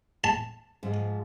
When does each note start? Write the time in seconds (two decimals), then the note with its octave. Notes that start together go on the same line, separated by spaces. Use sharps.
0.24 A5
0.83 G#2 F3 G#3